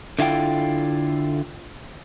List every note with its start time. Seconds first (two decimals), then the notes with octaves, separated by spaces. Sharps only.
0.19 D3 E4 F4 G5